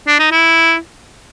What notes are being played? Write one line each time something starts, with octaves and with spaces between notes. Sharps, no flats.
D4
D#4
E4